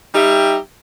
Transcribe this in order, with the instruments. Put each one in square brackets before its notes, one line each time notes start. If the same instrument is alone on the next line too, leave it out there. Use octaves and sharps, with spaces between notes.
[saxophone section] G3 D#4 G4 E5